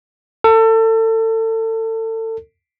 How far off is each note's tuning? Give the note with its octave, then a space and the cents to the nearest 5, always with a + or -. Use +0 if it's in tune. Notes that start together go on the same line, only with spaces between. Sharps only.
A4 +30